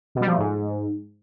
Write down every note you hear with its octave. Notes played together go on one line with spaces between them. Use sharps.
B2
G3
F3
A3
G#2